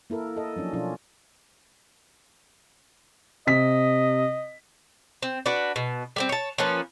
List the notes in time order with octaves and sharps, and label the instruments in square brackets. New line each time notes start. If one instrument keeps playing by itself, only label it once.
[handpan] A#3 E4 A4 A#4
A4 D#5
F3 F#3 C#4 D4
B2 F3 C#4 D4 F4
[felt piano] C3 B6 [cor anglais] D#5
[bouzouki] C4
D4 F#4 B4
B2
G3 A#3 C4
C#5 A5
F3 A#3 C#4 B4